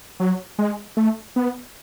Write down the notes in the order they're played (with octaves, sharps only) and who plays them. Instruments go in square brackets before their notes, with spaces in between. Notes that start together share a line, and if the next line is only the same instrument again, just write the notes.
[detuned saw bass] F#3
G#3
A3
B3